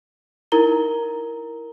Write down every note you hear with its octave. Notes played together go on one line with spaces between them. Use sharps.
D#4 E4 A#4 A#5 G7